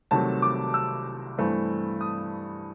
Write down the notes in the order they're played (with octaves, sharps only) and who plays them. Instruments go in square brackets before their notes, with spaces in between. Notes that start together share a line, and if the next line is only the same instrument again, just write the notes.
[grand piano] C2 C3 D#3 F#3 A3 A5
D6
E6
G2 E3 A3 C4
D#6